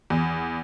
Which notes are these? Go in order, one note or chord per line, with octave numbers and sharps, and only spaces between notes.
E2